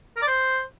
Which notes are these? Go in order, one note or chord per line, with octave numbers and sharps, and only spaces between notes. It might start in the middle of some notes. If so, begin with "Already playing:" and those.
A#4
D5
C5